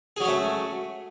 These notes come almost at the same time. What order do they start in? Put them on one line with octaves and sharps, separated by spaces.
G#4 F#3 C#4 A3